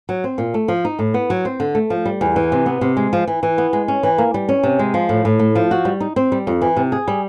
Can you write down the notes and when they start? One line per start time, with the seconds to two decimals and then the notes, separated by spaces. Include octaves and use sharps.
0.09 F#3
0.24 C4
0.38 A#2
0.54 A3
0.68 F3
0.85 D#4
0.99 A2
1.14 B3
1.30 F#3
1.45 C4
1.60 D3
1.75 A3
1.90 F3
2.06 G3
2.21 E2
2.36 E3
2.52 C3
2.66 B3
2.81 C3
2.97 G#3
3.13 F3
3.27 E3
3.43 E3
3.58 B3
3.73 G#3
3.88 C#4
4.03 E3
4.18 A#3
4.34 G3
4.49 C#4
4.63 C3
4.79 G#3
4.94 F3
5.09 A2
5.25 A2
5.39 A3
5.55 F3
5.71 F#4
5.85 G3
6.00 D#4
6.16 C4
6.32 G3
6.47 F2
6.62 E3
6.77 C3
6.92 G#4
7.08 G3